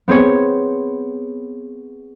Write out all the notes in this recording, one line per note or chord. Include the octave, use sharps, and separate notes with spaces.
B3 C4 G#4 C#5